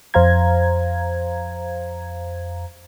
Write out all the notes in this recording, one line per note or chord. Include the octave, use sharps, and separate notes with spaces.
F2 C5 F5 A#5 G#6